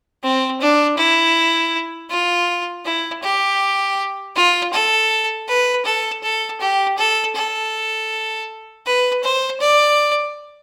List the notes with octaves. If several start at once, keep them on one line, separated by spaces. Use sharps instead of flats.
C4
D4
E4
F4
E4
G4
F4
A4
B4
A4
A4
G4
A4
A4
B4
C5
D5